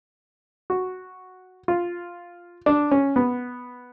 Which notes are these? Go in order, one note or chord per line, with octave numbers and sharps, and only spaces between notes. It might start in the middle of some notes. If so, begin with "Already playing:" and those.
F#4
F4
D4
C#4
B3